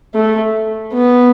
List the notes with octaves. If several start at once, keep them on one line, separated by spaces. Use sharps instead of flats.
A3
B3